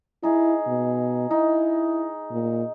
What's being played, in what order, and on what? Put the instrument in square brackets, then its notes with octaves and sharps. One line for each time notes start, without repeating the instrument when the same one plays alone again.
[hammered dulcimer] D#4 G#4 [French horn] E4
[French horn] B2
[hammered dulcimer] D#4 [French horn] E4
[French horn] A#2